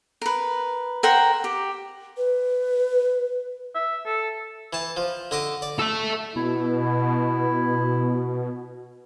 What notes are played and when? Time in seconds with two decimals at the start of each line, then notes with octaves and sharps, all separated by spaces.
0.22 A#4 B4
1.03 A#4 C5 F#5 G5
1.44 G4
2.17 B4
3.75 E5
4.06 A4
4.73 E3 A5
4.97 F3
5.31 D3 D#5 D6
5.62 D5
5.79 A4 E5
6.36 B2 E4